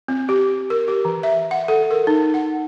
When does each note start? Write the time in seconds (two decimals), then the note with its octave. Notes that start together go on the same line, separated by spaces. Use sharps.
0.08 C4
0.29 G4
0.70 A#4
0.88 G4
1.05 E3
1.23 E5
1.51 F#5
1.68 A4
1.91 A#4
2.07 D#4
2.34 F#5